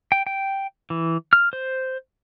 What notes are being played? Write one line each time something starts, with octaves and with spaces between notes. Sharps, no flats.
G5
G5
E3
F6
C5